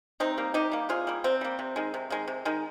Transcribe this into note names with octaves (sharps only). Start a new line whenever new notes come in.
C3 C4 D#4
G3 A#3
C3 D#4 G4
G3 A#3
C3 F4 G#4
G3 A#3
C3 C4
G3 A#3
C3
D#3 G#3
C3
D#3 G#3
C3
D#3 G#3